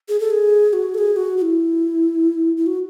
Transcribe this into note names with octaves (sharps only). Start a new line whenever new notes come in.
G#4
A4
G#4
F#4
A4
G#4
F#4
F#4
E4
E4
F#4